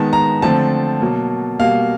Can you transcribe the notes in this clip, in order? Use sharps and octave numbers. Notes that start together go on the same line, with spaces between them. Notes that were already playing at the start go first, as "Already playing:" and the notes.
Already playing: D#3 G#3 B3 A5
A#5
D3 F3 A3 C4 A5
B2 F#3 A#3
B2 G3 A#3 F5